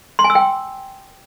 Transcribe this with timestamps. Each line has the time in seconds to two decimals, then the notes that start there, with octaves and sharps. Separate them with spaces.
0.19 C6
0.24 G#5
0.30 E6
0.35 G5